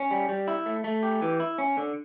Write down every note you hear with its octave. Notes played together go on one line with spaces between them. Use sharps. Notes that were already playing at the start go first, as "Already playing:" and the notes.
Already playing: C#4
G3
G3
E4
A3
A3
G4
E3
E4
C#4
D3